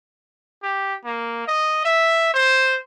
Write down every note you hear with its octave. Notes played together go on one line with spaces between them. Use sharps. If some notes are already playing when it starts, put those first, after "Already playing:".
G4
A#3
D#5
E5
C5